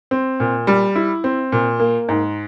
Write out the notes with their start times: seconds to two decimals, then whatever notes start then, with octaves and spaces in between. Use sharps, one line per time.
0.11 C4
0.40 A#2
0.67 G3
0.95 E4
1.24 C4
1.52 A#2
1.80 A#3
2.09 G#2